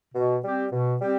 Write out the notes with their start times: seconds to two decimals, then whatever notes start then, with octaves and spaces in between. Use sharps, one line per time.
0.15 B2
0.43 G3 C4 G4
0.72 B2
1.01 G3 C4 G4